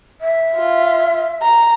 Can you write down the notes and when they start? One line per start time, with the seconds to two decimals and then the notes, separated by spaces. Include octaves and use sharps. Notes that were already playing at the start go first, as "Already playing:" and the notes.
0.21 E5
0.57 F4
1.43 A#5